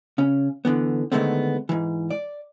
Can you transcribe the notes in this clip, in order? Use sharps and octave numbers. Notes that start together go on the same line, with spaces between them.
C#3 C#4
D3 E3 B3
D3 D#3 G#3 A3 B3 C4
G#2 E3
D5